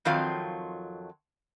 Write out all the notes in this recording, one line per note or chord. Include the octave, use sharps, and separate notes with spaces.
F2 D#3 F#3 C4 F4 F5